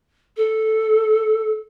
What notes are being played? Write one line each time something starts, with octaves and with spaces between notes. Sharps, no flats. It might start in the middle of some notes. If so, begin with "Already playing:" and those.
A4